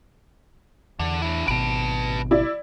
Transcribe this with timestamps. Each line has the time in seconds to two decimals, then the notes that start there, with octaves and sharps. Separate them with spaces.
0.99 E2 D3
1.22 D4 E4
1.48 G#1 B2 B4 A5 D7
2.31 E4 D5